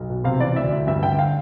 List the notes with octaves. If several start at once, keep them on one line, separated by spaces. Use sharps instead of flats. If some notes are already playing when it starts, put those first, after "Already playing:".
Already playing: B1
B2
C3 F5
E3 D5
D2 E5
D2
G2 E5
D3 G5
F5